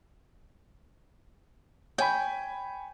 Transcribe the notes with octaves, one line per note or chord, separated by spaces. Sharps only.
C#5 G5 G#5 B5